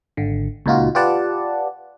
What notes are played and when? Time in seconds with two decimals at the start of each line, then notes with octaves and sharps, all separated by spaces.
0.17 G#1 D3
0.66 C#2 A#2 D#4 F4 F#4
0.95 F4 G4 B4 D5 F#5 A5